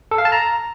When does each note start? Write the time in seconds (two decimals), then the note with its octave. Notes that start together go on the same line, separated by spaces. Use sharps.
0.11 A4
0.18 F5
0.25 A5
0.32 A#5